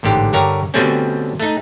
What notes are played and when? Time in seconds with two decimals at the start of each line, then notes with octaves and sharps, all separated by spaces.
0.03 A1 G#2 D3 G4
0.33 G2 D3 G4 A#4 C#5 A#5
0.74 B2 D3 G3 A3 C4 C#4
1.40 A3 D#4